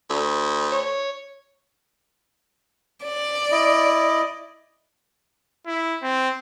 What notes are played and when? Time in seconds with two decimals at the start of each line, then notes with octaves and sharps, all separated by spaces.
0.10 D2
0.72 C#5
3.03 D5
3.52 E4 D#5
5.67 E4
6.02 C4